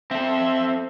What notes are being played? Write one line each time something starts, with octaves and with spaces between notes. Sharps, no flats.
C4 A4 E5